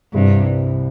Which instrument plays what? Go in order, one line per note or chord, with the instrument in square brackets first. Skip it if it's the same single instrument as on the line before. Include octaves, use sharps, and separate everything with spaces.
[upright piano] C2 C3 G3 [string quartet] G2